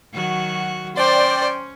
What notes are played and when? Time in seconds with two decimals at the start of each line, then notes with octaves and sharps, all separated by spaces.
0.14 D#3 F#3 F#4
0.97 C#4 C5 D5 G5